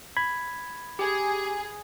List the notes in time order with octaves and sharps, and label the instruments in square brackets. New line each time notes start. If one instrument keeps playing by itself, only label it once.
[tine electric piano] B5 G#6
[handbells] G4 [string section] G#4